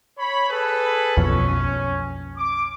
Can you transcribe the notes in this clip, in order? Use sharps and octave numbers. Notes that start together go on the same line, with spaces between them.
C#5 B5
G#4 A4 B4
B1 F2 C#4
D6